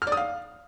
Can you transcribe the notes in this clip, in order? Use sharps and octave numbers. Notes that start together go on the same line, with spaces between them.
F6
D5
D#6
F5